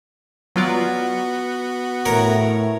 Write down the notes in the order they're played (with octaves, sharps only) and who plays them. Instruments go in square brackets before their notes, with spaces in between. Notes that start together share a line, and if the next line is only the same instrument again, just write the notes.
[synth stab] F#3 F4 D5 [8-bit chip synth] B3 F#4
[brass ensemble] A2 [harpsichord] A#4 C#5 A#5